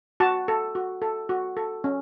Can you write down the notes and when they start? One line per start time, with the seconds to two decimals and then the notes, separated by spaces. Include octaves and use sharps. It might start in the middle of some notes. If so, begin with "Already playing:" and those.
0.20 F#4 A5
0.48 A4
0.75 F#4
1.02 A4
1.29 F#4
1.57 A4
1.84 C#4